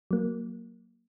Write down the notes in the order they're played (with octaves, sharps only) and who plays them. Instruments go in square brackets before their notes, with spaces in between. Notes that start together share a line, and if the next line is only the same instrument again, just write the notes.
[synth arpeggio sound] F#3 A#3